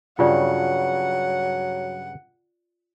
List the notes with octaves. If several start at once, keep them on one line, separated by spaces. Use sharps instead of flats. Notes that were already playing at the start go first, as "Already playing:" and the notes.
G2 C#3 F#3 F4 D5 F#5 G5